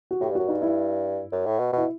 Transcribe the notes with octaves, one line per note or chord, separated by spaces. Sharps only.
F#4
A2 G4
G2
F#2 F#4
G2 D#4
E4
F#2
A2
B2
B2 E4